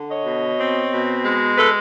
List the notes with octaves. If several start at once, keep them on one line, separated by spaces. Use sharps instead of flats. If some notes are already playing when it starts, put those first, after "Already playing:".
Already playing: D3
C#5 D#5
B2
C4
B2
G#3
A4 B4